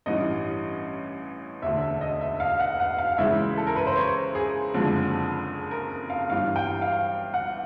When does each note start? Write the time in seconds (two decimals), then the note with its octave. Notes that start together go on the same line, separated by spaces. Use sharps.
0.06 A1 G2 E3 D#5
1.62 E1 D2 D3 E5
1.82 E5
2.01 D#5
2.21 E5
2.40 F5
2.60 F#5
2.80 F#5
2.98 F5
3.18 C#2 C#3 E3 G#3 E5
3.57 A4
3.67 A#4
3.76 B4
3.87 C5
3.96 C#5
4.35 G#4
4.74 F#1 F2 D3 F3 G#3
5.71 A#4
6.10 F5
6.29 G1 G2 E3 F5
6.56 G5
6.82 F5
7.34 F#5